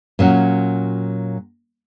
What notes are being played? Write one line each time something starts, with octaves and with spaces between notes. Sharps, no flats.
A#2 F#3 C#4 F#4